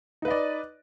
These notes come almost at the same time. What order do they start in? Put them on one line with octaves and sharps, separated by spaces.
D#4 B4 D#5 D5